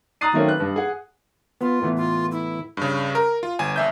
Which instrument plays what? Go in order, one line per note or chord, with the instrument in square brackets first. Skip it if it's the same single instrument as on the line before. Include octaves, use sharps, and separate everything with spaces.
[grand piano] A#5 D#6 F#6 A6 C7 D#7
D#3 F#3 A3 A#3 C4 C#4
B4 F#6
G2
G#4 F#5
[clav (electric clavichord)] B3 [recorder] F4
[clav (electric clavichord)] A2 E3 B3
[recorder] F4
E4
[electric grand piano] G2 C#3
A#4
F4
G1 G#5
A#1 E5 G6